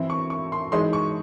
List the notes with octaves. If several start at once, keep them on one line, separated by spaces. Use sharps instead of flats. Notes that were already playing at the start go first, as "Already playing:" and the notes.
Already playing: E3 C4 E4
C#6
C#6
C6
E3 G#3 D#4 C6
C#6